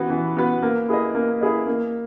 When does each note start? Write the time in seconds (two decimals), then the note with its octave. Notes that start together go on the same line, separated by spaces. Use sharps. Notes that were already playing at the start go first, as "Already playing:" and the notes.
Already playing: E3 B3 F#4 B4
0.10 E3
0.36 B3 F#4 B4
0.63 A#3
0.88 E4 G#4 B4 D#5
1.15 A#3
1.41 E4 G#4 B4 D#5
1.67 A#3